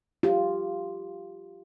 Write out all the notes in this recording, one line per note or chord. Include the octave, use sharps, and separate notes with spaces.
F4 G4